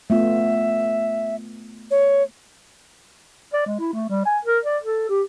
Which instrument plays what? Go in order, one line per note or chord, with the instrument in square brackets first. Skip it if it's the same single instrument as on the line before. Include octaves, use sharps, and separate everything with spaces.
[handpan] A3 B3 F4 [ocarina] E5
[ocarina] C#5
[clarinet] D5
G#3
E4
A3
G3
G#5
A#4
D5
A4
G4